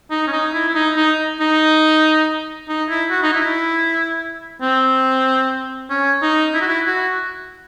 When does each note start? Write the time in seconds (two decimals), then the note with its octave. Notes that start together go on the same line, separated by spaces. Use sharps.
0.11 D#4
0.27 C#4
0.32 D#4
0.54 E4
0.69 E4
0.75 D#4
0.97 D#4
1.40 D#4
2.69 D#4
2.89 E4
3.11 F#4
3.23 D#4
3.33 E4
4.62 C4
5.90 C#4
6.22 D#4
6.54 E4
6.62 F#4
6.68 E4
6.87 F#4